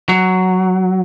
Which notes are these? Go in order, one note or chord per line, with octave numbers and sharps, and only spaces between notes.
F#3